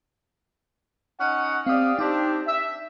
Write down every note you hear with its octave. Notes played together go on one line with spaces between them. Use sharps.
C#4 D#4 F#5
C4 G4 D5 F5 D#6
C4 D4 D#4 G4
E5